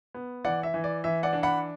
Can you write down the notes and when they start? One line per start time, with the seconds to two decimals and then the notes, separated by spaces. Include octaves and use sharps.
0.14 B3
0.44 E3 D5 F#5
0.63 E5
0.74 E3
0.84 D5
1.04 E3 E5
1.23 D5 F#5
1.33 D4
1.43 F#5 B5